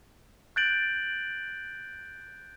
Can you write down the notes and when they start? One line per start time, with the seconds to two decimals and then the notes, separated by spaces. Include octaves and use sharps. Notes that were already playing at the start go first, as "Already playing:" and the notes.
0.56 F#6 G6 A6 D7 F#7